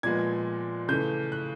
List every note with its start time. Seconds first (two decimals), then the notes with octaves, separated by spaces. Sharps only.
0.03 A#2 F3 G#3 B3 G#6
0.88 C#3 E3 A3 G6
1.32 F#6